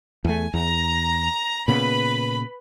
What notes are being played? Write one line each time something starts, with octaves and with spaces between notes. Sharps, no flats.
E2 A3 G#5
E2 A#5
A#2 C#3 B3 B4 B5